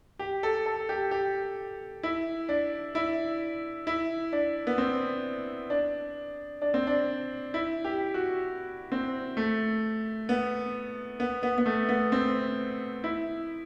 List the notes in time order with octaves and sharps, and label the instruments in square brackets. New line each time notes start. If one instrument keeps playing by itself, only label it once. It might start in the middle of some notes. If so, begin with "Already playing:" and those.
[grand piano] G4
A4
A4
G4
G4
E4
D4
E4
E4
D4
B3
C4
D4
D4
C4
D4
E4
G4
F#4
C4
A3
B3
B3
B3
B3
A3
B3
C4
E4